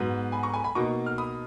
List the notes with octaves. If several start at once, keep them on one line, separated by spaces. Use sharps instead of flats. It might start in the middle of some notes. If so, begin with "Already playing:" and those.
Already playing: G#2 F#3 B3
G#5 B5
A#5 C#6
G#5 B5
G#5 B5
B2 A#3 D#4 A#5 C#6
F6
B5 D#6